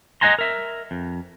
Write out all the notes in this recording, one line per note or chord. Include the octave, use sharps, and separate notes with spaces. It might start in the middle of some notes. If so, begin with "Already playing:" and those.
D#5 F5 F#5 G#5 A#5 C6
A#4 E5
F2